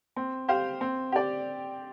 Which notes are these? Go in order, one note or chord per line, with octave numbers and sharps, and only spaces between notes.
C4
G4 C5 F5
C4
G4 D5